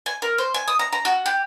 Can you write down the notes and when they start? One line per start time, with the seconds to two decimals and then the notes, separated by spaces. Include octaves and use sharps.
0.06 G#5
0.22 A#4
0.38 C5
0.54 G#5
0.68 D#6
0.79 A#5
0.92 A#5
1.05 F#4
1.26 G4